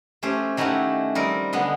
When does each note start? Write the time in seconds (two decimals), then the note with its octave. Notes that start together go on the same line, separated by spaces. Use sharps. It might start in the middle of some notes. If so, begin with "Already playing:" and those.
0.23 A3 C#4 G4 C5
0.57 D#3 A3 C#4 E4 F#4 G4
1.15 G3 C4 A#4 D#5
1.53 D3 G#3 B3